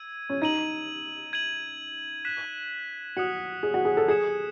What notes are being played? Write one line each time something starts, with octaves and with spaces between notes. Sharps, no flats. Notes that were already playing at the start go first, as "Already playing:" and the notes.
Already playing: E6 G#6 D#7
C#4
D#4 G#6 D#7 F#7
G#6 D#7 F#7
F#6 B6 E7
F#4 D#6 F#6 C#7 F#7
G#4
F#4
G#4
A4
G#4 G#6 C#7 E7